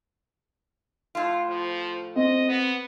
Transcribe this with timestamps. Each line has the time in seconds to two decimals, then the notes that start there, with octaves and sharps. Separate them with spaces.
1.15 A2 F4
1.48 F3
2.16 C4 D#5
2.49 B3